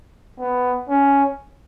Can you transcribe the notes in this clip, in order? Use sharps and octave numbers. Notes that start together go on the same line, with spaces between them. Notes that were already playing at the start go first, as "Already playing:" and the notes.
B3
C#4